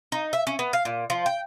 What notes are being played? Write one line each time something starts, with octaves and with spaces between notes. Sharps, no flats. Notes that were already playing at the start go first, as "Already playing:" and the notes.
D#4
E5
C#4
B3
F5
A#2
F3
G5